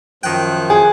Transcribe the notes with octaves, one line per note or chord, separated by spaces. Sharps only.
F#2 D#3 F3 G5 F#6
G#4 G#5